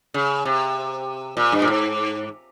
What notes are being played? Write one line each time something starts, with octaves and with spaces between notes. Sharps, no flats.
C#3
C3
A#2
G2
A#2
G#2